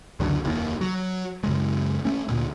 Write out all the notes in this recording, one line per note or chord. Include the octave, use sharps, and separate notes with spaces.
C#2 F#2 D3 F#3
F1 D#2 D#3
F#3
F#2 C#3 G#3
A3 C#4
D2 A#2